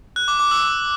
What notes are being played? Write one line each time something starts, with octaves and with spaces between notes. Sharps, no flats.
F#6
D6
D6
E6